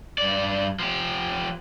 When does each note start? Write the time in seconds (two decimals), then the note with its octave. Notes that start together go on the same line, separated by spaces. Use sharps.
0.18 G2 D5
0.80 F3 G4